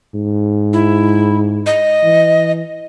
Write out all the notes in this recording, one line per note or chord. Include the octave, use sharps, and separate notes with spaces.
G#2
E4
D#5
E3